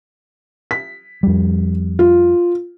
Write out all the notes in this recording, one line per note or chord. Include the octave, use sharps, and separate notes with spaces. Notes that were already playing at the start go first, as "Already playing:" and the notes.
B6
F2 G3
F4